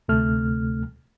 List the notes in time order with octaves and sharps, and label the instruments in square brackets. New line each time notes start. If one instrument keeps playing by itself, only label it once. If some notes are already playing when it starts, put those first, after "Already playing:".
[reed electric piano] D2 C3 A3 F6